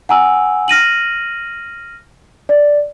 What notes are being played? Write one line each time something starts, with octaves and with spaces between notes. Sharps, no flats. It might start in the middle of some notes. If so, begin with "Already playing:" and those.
F#5 G#5 A#5 E6
F6 A#6 D#7 F#7
D5